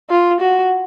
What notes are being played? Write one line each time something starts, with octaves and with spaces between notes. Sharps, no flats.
F4
F#4